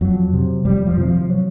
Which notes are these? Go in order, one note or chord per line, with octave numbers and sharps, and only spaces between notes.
F2 F#3
C3
F2 G3
F3
C3 E3
F3
F#3